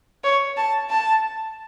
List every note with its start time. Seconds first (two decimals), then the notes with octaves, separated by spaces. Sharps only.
0.24 C#5
0.57 A5
0.90 A5